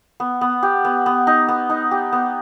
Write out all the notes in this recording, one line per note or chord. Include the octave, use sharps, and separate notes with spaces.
B3
B3
G4
B3
B3
D#4
B3
D#4
G4
B3